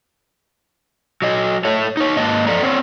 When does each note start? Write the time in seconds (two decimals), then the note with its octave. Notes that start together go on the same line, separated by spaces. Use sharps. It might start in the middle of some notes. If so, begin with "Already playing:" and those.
1.22 F#3 D#5
1.65 A3 A4 C#5
1.97 D#4 C#5
2.16 G#2 A#3 D#5 A5
2.47 F2 A4 D5 A#5
2.62 B3 C4 C#5